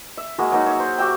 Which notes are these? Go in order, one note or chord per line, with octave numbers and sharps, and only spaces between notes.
E5
G#3 A#3 F#4 G#4
F#3 A#3 D#4
C#5 E5
C5
F#4 G4 E5 G5